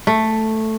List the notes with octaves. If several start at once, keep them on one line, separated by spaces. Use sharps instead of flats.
A3